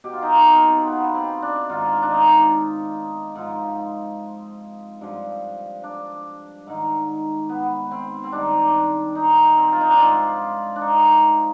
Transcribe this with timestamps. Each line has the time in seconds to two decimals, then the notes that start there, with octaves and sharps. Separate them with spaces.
0.04 B2 G4
0.13 F4
0.23 D#4
0.32 F4
0.46 C4
0.77 C4
0.87 B3
1.15 C4
1.42 D4
1.70 G#2 D#3 F4
2.02 D4
2.11 D#4
3.35 G#2 F3
5.01 G2 F3
5.83 D4
6.67 G#2 D#3
7.49 B3
7.91 C4
8.24 C4
8.32 G2 D#3 D4
9.15 D#4
9.57 C4
9.72 F4
9.81 D#4
9.90 D4
9.98 G#2 F3 C4
10.76 D4
10.81 D#4